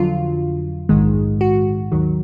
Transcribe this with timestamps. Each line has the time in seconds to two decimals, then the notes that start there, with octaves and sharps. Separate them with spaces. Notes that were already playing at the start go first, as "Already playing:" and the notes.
Already playing: F2 D3 F#3 F4
0.89 A#1 G#2 D#3 G#3
1.41 F#4
1.92 D#2 D#3 F#3